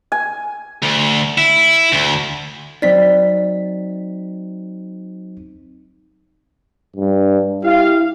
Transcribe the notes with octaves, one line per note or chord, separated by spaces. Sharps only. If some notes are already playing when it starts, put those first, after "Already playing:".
G#5
D2
E4
D2
F#3 C4 D#4 D5 B6
G2
E4 G4 F5